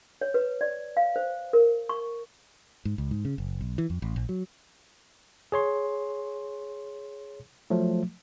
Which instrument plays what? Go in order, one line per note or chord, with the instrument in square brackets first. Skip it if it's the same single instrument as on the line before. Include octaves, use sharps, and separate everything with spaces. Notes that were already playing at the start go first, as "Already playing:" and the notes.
[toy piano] C#5
B4
D5
F5
C5
A#4
C#6
[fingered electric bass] G#2
C#2
G#2
C#3
F#1
B1
E3
F2
A1
A#1
F#3
[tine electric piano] G#4 C#5 C6
F3 F#3 A3